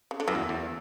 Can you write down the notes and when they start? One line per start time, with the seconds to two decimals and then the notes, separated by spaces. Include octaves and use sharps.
0.11 C#3
0.20 D3
0.28 F#2 E3
0.35 E2
0.49 E2